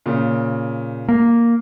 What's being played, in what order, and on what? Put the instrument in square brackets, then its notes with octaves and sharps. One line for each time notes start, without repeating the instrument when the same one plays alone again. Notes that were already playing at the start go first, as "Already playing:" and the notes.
[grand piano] A#2 C#3
[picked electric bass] A#3